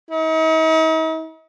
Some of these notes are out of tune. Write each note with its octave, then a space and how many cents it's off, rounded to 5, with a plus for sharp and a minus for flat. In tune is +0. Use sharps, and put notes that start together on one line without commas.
D#4 +45